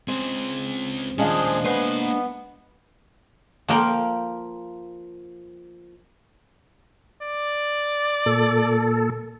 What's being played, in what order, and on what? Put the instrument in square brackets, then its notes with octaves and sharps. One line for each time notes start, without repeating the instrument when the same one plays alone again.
[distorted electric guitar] C#2 G#4 [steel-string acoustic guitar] C4
[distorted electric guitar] D#2 A#2 [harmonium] F3 G#4 [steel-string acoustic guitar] G#3 D4 F5 [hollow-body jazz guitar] C#4
[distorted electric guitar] A#3 G#5 [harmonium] B3 [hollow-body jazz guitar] B4 C5
[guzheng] F3 A#3 G5
[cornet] D5
[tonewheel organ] A#2 A4